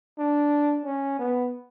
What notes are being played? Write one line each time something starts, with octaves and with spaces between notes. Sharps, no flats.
D4
C#4
B3